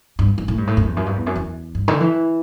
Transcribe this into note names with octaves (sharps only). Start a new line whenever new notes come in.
G2
G2
A2
G2
A2
F#2
E2
F#2
G2
E2
F#2
E2
G2
D3
E3